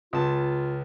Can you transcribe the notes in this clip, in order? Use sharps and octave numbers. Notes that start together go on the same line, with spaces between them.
C#2 F4 A5